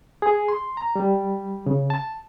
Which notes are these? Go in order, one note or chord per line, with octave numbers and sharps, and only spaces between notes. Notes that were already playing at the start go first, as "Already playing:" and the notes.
G#4
C6
A#5
G3
C#3
A5